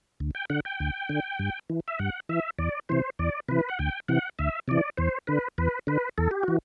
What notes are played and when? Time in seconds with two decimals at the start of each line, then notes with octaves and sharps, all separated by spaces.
0.20 D2
0.35 G5
0.50 D3 F#5
0.65 G5
0.80 D2
1.09 D3
1.39 G2
1.70 E3
1.88 E5
1.99 G2 F#5
2.29 E3 E5
2.59 E2 D5
2.89 C3 E3 C5
3.19 E2 D5
3.48 C3 E3 B4
3.69 F#5
3.79 D2 G5
4.08 C3 E3 F#5
4.39 D2 E5
4.68 C3 E3 D5
4.97 E2 C5
5.27 D3 B4
5.58 E2 B4
5.87 D3 B4
6.18 E2 A4
6.31 G4
6.43 E3 F#4